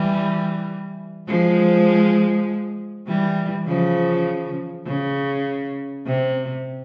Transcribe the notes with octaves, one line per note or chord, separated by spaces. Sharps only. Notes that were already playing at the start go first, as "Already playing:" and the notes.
Already playing: E3 G3
F3 G#3
E3 G3
C#3 F3
C#3
C3